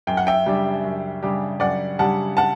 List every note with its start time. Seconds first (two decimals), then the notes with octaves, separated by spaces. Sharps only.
0.07 F#2 G5
0.17 F#5
0.27 E5 G5
0.46 C#3 G3 D4 G4
0.84 F#2
1.23 C#3 G3 D4 G4
1.60 F#2 D5 F#5
1.99 C#3 G3 D4 G4 F#5 A5
2.37 F#5 A5